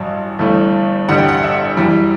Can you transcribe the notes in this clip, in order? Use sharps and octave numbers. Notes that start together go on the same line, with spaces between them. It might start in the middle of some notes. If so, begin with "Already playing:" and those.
Already playing: A1 G2 F#3
G1 G2 E3 A3
A1 G2 D3 G3 F#5
G5
F#5
E5
F#2 E3 G3